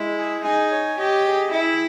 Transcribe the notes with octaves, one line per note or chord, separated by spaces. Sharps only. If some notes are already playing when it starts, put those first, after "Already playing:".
Already playing: G#3 E4
G#4
D#4 G#5
C#5
G4 D#5
G#4
E4 G5